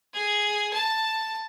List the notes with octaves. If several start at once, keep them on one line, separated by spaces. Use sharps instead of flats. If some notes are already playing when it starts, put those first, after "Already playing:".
G#4
A5